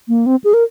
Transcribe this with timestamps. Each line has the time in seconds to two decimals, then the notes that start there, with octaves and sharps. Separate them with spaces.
0.08 A#3
0.26 C4
0.44 G#4
0.54 A#4